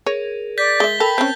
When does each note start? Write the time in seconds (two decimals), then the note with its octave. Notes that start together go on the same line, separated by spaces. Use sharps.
0.06 G#4 A#4 C#5
0.58 D5 G6 A6 B6
0.80 G#3 E5 G7
1.00 A4 A#4 G5 A5 B5
1.18 C4 C#4 G6